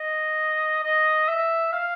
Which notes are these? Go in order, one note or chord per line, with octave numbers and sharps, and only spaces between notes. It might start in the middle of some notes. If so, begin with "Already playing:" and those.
Already playing: D#5
D#5
E5
F5